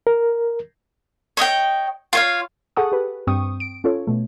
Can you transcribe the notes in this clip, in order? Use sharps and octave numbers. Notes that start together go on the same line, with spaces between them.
A#4
C#5 D#5 E5 G5
F4 C#5 F5
G#4 A4 F#5 A5 C#6 D#6
G4 B4
G2 C4 G5 C#6 D#6
D7
C#4 F4 A4 C#5
B2 A3